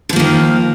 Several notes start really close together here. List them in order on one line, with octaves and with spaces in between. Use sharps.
D3 F3 A#3 D#3